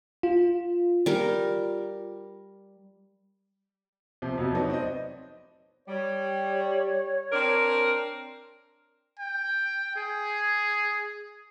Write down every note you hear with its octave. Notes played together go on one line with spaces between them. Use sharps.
F4
G3 A#4
C3 F3
F2 C3 F#3
F#3 A3 B3 D#4 C#5 D5
C4 D#5
G3 C#5
C4 D4 A#4
G5
G#4